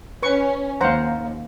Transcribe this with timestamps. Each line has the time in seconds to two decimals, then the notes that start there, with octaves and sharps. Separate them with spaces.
0.23 C#4 B4 C#6
0.81 D#2 C5 F5 F#5 A#5